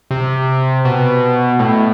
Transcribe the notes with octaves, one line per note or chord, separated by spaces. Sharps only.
C3
B2
A2